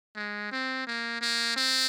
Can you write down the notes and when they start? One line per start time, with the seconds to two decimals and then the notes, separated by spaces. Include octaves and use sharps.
0.16 G#3
0.52 C4
0.87 A#3
1.21 A#3
1.56 C4